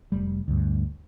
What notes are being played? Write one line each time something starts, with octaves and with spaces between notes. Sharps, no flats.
F1 G3
D2 G2